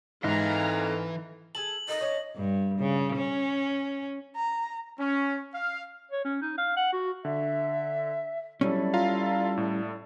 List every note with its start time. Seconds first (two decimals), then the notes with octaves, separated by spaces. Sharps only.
0.24 G#2 E3 A4 D#5 F5 A#5
1.55 G#4 A4 A5 F#7
1.88 A4 A#4 D#5
2.01 C#4 D4 C#5
2.36 G2
2.80 C#3
3.16 C#4
4.36 A#5
5.00 C#4
5.55 F5
6.12 C#5
6.25 C#4
6.42 D#4
6.58 F5
6.77 F#5
6.93 F#4
7.25 D3 E5
8.61 F#3 G3 C#4 E4 A4 D5
8.94 F4 F5 A#5
9.57 A2